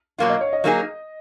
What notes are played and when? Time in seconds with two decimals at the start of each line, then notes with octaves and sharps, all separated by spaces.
0.18 B2 F#3 A#3 F4 F5
0.30 D#5
0.41 C#5
0.53 D#5
0.64 F#3 A#3 D#4 G#4